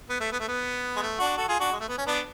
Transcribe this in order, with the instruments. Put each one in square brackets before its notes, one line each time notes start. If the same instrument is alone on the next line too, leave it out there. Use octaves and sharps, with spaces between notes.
[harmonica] B3
A3
B3
A3
B3
G#3
A3
D4 F#4
F#4 A4
F4 G#4
D4 F#4
G#3
A3
B3
C#4
B3 D4